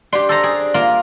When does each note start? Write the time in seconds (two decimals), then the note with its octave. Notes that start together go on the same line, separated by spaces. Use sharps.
0.13 D4 G4 C6
0.29 A4 C5 A#5
0.44 G#4
0.74 A#3 F4